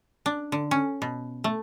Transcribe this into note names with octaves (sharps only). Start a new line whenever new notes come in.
D4
D3
C#4
B2
A3